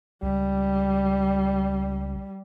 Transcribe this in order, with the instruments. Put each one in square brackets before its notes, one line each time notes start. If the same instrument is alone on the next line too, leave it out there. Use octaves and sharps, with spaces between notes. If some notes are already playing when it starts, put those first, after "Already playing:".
[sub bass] C#2 [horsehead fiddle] G3